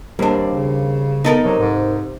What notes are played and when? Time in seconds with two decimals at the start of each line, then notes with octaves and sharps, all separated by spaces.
0.19 D#2 G3 A#3 C4 D4
0.48 C#3
1.24 B3 D#4 A4 A#4
1.44 C3 F#3
1.59 G#2